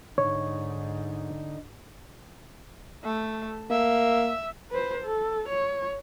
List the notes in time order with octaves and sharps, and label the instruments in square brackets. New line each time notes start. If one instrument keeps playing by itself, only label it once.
[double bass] G#2 [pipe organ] D3 D#4 [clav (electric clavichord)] C#5
[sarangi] A3
[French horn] A#3 [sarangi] E5
[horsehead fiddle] B4 C5
A4
C#5